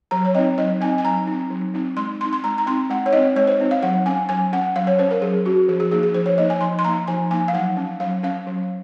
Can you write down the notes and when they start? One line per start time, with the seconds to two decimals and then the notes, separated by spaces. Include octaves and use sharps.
0.11 F#3 A#5
0.25 C#5
0.35 C4 D#4 D#5
0.58 F#3 D#5
0.81 C4 D#4 G#5
0.98 G#5
1.04 F#3 A#5
1.27 C4 D#4
1.50 F#3
1.74 C4 D#4
1.97 G#3 C6
2.21 C4 C6
2.25 D#4
2.33 C6
2.44 G#3 A#5
2.58 A#5
2.66 C4 D#4 C6
2.90 G#3 F#5
3.06 C#5
3.13 C4 D#4 D#5
3.36 G#3 C#5
3.47 C5
3.60 C4 D#4
3.71 F5
3.82 F#3 F#5
4.06 C#4 G#5
4.29 F#3 G#5
4.53 C#4 F#5
4.76 F#3 F5
4.87 C#5
4.99 C#4 C5
5.11 A#4
5.22 F#3 G#4
5.45 C#4 F#4
5.68 F3 G#4
5.80 G#4
5.91 A#3 D#4 G#4
6.03 G#4
6.14 F3 C5
6.26 C#5
6.38 A#3 D#4 D#5
6.50 G#5
6.61 F3 C6
6.79 C6
6.84 A#3 D#4 A#5
7.08 F3 G#5
7.31 A#3 D#4 G#5
7.48 F5
7.53 F#3 F#5
7.77 C#4
8.00 F#3 F5
8.23 C#4 F5
8.47 F#3